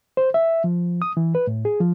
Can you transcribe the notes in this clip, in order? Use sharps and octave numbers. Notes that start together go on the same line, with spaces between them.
C5
E5
F3
D#6
E3
B4
A2
G#4
F3